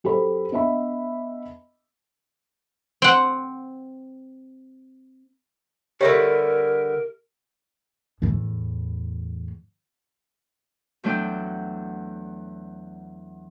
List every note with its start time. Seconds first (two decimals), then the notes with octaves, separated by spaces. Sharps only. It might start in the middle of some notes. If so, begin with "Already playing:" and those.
0.04 F#2 G4 A4 C5 B5
0.52 B3 D4 D#5 E5 B5
3.02 C4 F#5
6.01 D3 G3 G4 A#4 B4 C#5 E5 D#6
8.22 E2 A2
11.04 E2 F#3 A3 D4 G5